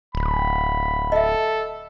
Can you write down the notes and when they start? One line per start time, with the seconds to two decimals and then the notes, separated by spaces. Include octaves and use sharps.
0.15 D1 B5
1.12 A4 D#5 E5